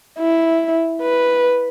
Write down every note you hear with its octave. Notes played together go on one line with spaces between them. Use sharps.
E4
B4